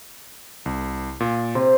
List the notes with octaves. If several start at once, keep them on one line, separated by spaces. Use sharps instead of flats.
C2
A#2
C3 C5